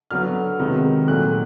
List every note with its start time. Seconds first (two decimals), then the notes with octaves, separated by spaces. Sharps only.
0.11 D3 F#3 B3 F6
0.59 C3 D#3 G#3 B3 D#4
1.08 A#2 F#3 A3 F#6